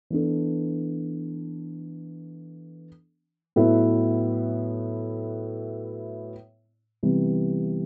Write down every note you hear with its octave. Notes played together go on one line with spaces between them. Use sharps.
E3 B3 D4 A4
A2 F#3 B3 E4 B4
C3 E3 G3 B3